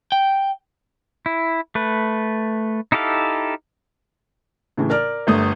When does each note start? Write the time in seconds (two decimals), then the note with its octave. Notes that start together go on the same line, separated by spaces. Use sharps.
0.12 G5
1.26 E4
1.75 A3 B4
2.92 D#4 E4 G4 A4 F5
4.77 A2 C#3 E3
4.90 A#4 D5 F6
5.27 G1 A3 D#6